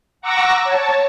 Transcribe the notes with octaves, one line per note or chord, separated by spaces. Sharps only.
F#5 A#5 C#6 D6 E6 A#6
C#5 A5